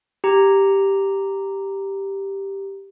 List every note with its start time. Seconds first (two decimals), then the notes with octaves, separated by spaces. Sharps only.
0.24 G4 A#5